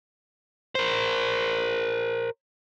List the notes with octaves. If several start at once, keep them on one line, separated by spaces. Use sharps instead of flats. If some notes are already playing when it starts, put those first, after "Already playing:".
A#4 C5